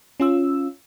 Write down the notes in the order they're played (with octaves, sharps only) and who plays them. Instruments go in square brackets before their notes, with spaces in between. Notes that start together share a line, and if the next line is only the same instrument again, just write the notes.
[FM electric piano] C#4 F4 E6